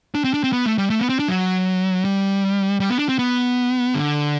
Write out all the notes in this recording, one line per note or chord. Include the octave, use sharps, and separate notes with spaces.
D4
C4
D4
C4
B3
A3
G3
A3
B3
C4
D4
F#3
G3
G3
B3
D4
C4
B3
D3